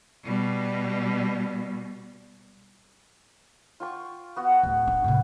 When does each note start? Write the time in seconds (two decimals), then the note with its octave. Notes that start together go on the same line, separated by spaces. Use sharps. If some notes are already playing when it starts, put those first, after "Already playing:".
0.24 B2 G3
3.80 F4 G5 C#6
4.36 B3 F#4
4.63 D1
4.87 D4
5.04 A2 C3